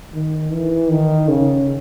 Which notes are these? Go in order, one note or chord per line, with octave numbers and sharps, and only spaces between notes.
D#3
E3
D#3
C#3